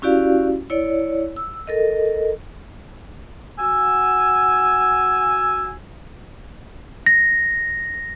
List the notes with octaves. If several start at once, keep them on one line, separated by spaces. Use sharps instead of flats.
C#4 E4 F#4 G4 D5 F5
E4 C#5 D5
E6
A4 A#4 D#5
F#4 G#5 E6
A#6